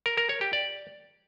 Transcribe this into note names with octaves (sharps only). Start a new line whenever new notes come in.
A#4
A#4
C#5
G4
D5